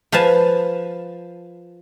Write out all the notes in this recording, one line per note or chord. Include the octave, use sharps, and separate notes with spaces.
F3 B4 F5 G#5 A5